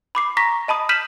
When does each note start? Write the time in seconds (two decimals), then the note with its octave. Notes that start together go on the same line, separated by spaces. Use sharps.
0.15 B5 D6 C7
0.37 A#5 C#6 A#6 B6
0.68 D#5 A5 B5 D#6
0.89 F6 G6 B6 D#7 E7 F#7